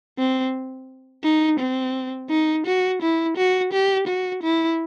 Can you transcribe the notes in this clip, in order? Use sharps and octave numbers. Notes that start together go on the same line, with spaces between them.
C4
D#4
C4
D#4
F#4
E4
F#4
G4
F#4
E4